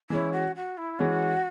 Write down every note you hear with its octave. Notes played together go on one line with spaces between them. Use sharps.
E3 G#3 C#4 E4
F#4
F#4
E4
E3 G#3 C#4 F#4